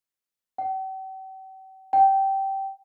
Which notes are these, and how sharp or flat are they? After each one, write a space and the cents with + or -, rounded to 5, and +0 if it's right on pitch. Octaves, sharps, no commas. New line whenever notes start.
G5 -45
G5 -15